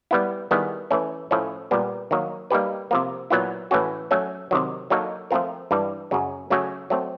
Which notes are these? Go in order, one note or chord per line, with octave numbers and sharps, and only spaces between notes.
G3 B3 E4
D#3 G3 B3 E4 G#4
E3 A3 C#4
A2 F3 A3 C#4
A#2 G3 B3
D#3 F#3 A#3
G3 A#3 D#4 G4 B4
C3 F3 A#3
A#2 F#3 B3 E4
A2 E3 A3 C#4 F#4
F#3 A3 C#4
C3 D#3 F#3
F#3 A#3 D#4 F#4 A4
F3 A3 C4 F4 A#4
G2 E3 G3
F#2 C#3 F#3
C#3 F#3 A3 C#4 F#4
F#3 A3 C4